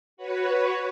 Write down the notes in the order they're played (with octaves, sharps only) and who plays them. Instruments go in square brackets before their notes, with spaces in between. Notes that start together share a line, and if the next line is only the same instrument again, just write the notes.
[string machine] F#4 B4 C#5